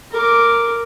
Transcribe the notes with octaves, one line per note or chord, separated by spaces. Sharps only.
A#4 D6